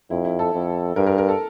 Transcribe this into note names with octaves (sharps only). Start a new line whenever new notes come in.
F2 E4
E4
A4
F2
G2 A#4
A#4
A#4
A4